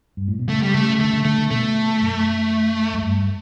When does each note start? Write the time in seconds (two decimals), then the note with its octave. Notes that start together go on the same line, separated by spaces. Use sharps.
0.17 G2
0.28 A2
0.39 B2
0.49 C#3 A3
0.62 G3
0.74 C#3 A3
1.00 D3 A3
1.13 D3
1.25 D3 A3
1.38 D3
1.51 B2 A3
2.02 F#2
2.94 F#2
3.02 G2